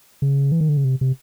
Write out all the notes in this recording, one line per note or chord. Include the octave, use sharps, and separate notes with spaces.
C#3
E3
D#3
D3
C#3
C3
C3